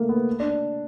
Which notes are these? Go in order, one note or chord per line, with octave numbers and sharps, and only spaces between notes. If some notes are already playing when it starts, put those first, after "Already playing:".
Already playing: A3 A#3
B3
D4